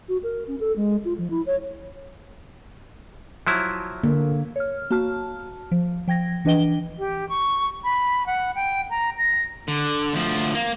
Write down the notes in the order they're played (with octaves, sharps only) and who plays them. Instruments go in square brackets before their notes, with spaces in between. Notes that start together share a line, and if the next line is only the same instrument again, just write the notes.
[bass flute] F#4
A#4
C#4
A4
G#3
F4
F3
E4
C#5
[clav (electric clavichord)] F3 F#3 E4
[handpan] D3 A#3
[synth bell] C#5 F6
A#3 F#4 A5 F6
F3
F3 G5 G#6 A#6
E3 D4 B4 D#5 G5 G7
[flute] G4
C#6
B5
F#5
G5
A#5
A#6
[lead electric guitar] D3
D2 F3
A#3